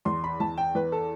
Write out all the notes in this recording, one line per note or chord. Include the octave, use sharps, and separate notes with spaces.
E2 C6
B5
E2 A5
G5
E2 B4
A4